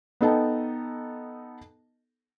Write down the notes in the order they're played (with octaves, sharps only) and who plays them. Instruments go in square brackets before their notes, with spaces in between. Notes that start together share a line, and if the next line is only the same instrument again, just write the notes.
[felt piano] B3 D#4 A4 D#5 G5 A5